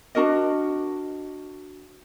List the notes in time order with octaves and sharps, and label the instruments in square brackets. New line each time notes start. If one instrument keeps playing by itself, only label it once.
[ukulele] D4 F#4 A#4 D#5